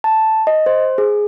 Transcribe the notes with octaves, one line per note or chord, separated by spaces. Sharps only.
A5
D#5
C5
G#4